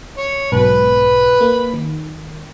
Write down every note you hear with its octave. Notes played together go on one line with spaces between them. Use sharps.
C#5
B1 G#2 B2 B4 B5
A#3
D#3